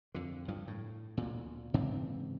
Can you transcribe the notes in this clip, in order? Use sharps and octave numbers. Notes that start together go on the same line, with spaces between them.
F2 D3
G2 F3
A2
D2 A#2
G#2 C#3 E3 C4